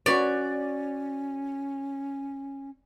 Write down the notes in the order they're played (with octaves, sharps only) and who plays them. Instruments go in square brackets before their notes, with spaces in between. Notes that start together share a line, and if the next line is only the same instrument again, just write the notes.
[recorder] C#4 [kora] F#4 B4 C#5 [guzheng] D5